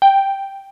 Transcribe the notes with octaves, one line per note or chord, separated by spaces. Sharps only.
G5